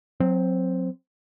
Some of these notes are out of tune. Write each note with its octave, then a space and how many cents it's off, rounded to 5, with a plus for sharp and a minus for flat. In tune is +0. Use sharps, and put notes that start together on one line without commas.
F#3 -20 C4 +0